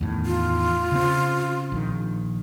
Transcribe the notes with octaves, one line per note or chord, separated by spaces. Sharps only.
E2 A2 D#3
F4
C#3 C4
A#1 D#3